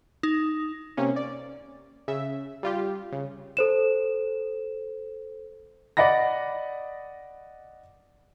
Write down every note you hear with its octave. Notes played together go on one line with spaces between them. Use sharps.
D#4
C3 A#3 C#4
D5
C#3 E5
G3 F4 G4
C#3
A4 C5 E7
D5 D#5 F#5 B5 A#6